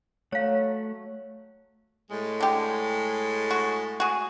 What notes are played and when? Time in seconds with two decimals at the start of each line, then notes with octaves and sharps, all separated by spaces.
0.32 F#3 A3 C#5 F5 F#5
2.10 A2 G#3
2.40 D3 G4
3.51 F#4
4.00 F#4 G#4